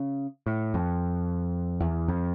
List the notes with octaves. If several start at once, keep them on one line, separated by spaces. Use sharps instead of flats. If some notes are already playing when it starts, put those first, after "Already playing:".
Already playing: C#3
A2
F2
E2
F2